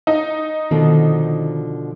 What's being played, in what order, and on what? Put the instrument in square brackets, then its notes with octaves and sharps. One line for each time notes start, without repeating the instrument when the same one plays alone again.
[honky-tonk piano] D#4
[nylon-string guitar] B2 D3 F3 [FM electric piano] D#3